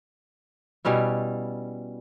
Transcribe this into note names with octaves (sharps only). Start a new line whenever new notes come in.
B2 G3 C#4 E4